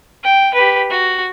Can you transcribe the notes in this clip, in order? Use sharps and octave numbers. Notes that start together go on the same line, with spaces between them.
G5
G4 B4
F#4